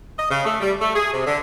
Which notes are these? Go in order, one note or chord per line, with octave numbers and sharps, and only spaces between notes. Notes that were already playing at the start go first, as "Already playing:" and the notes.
D#5
C#3
A3
G3
A3
G#4
C3
D3